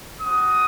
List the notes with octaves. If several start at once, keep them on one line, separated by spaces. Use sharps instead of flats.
C4 F#4 D#6